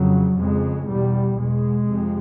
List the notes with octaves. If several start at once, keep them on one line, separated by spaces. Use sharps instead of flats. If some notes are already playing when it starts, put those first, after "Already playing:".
Already playing: F2 C#3 F#3
F2 C#3 G#3
E2 B2 G3
E2 B2 G#3
F2 C3